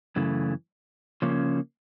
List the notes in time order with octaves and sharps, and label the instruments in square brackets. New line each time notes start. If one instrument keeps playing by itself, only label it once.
[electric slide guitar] F#2 C#3 E3 A3
C#3 F3 A#3 C#4